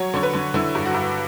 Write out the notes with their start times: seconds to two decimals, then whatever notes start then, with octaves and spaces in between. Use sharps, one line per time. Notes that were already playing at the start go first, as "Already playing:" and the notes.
Already playing: F#3 C#5
0.14 D3 C#5
0.23 B4
0.33 D3
0.54 D3 E4
0.75 G2
0.85 F#4
0.95 G2